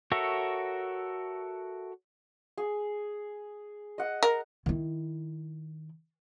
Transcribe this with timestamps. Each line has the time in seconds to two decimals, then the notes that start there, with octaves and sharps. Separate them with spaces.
0.12 F#4 A4 A#4 C#5 E5
2.58 G#4
3.98 D#5 F#5
4.23 A#4
4.66 D#3 E4